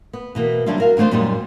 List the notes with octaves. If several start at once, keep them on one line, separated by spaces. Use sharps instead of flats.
B3
B2 E3 A#3
F#3 G3 C#4 D4 E4 F4
F#4 A#4 F5
E2 D3 A3 F4 C5
F#2 A#2 F#3 G3 D#4